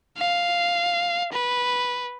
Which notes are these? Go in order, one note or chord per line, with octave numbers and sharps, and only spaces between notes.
F5
B4